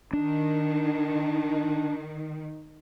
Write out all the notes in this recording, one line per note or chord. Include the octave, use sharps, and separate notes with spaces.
D#3 D4